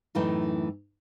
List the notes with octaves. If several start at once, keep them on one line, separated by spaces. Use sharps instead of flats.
F#2 A2 E3 A3 D#4 G5